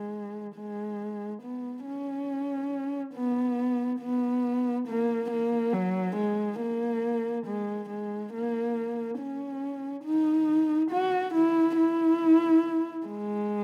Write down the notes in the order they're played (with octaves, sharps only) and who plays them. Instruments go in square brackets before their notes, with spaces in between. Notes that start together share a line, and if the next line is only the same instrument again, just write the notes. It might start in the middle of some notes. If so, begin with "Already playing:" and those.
Already playing: [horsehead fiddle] G#3
G#3
B3
C#4
B3
B3
A#3
A#3
F#3
G#3
A#3
G#3
G#3
A#3
C#4
D#4
F#4
E4
E4
G#3